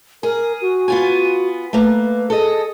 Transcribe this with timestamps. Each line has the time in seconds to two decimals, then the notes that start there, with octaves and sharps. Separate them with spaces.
0.23 G#4 A#4
0.62 F#4
0.88 B3 F4 G#5
1.73 A3 A#3 B4
2.30 G#4 A4 D#5